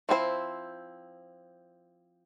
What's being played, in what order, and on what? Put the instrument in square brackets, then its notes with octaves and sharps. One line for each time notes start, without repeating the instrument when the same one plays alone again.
[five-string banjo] F3 C4 E4 G#4 C5